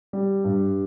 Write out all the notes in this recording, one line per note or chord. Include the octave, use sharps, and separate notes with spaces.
G3
G2